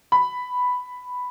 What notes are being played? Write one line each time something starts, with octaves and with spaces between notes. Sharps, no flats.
B5